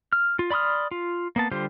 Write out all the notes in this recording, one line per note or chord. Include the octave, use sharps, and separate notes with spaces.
F6
F4
D5 B5 C6 D#6 F6
F4
A#3 B3 A5
D3 G3 F4 G4 C5